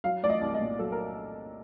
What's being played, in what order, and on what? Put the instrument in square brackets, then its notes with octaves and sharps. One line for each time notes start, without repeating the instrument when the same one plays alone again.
[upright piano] F#3 F5
A3 D5
D#5
C2
D#5
A#2
F#3 A4
A#4